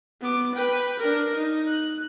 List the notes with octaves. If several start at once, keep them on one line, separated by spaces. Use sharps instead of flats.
B3 D6
B4 G5
D4 A#4
D#4
F#6